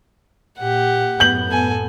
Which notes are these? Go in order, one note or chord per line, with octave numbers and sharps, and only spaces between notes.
A#2 G4 F#5
F#2 A2 B3 G6 F#7
A4 G#5